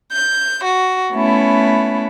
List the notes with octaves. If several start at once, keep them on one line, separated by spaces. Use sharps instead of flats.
G6
F#4
A3 B3 C#4 E4